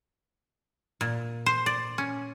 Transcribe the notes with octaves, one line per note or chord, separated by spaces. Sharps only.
A#2
C5
D5
C#4